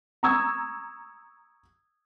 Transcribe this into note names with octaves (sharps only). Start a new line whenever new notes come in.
A#5 C#6 D#6 E6 G#6